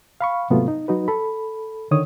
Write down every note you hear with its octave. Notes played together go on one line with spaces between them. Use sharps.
F5 B5 C#6
G#2 C3 F#3 A3 B3 F4
D#4
F#3 D#4 F#4 B4
A4 B5
D3 D#3 C#5 D#6